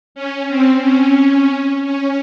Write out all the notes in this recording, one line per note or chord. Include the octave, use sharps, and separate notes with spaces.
C#4
C4
C#4
C#4